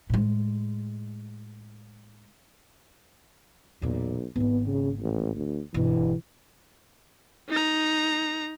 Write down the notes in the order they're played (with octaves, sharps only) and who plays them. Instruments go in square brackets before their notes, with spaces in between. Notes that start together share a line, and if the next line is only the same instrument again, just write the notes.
[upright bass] A2 G#3
[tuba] B1 [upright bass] E2 A#2
[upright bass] G#1 A#3 [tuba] B3
[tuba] C#3
A1
D2
[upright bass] G1 B2 [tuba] E3
[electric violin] D#4 A#5